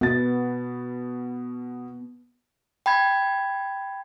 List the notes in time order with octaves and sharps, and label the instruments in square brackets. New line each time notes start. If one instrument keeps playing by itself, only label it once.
[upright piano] B2 A6 [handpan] B3
[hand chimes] G5 B5 G#6